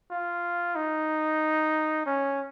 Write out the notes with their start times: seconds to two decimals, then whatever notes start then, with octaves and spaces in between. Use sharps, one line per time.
0.11 F4
0.76 D#4
2.06 C#4